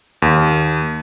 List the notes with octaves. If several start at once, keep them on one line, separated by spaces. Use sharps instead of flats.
D#2